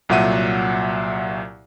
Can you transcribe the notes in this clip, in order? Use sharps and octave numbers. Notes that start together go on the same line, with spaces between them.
C2 A#2 F#3 E5 F#5 D#7